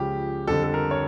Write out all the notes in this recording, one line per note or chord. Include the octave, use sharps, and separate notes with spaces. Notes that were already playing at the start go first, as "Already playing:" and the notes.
Already playing: C#2 C#3 F3 G4
F2 D3 G3 A4
A4
A#4
C#5